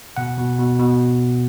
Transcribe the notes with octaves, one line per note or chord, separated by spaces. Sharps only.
B2 F#5
B2
B2
B2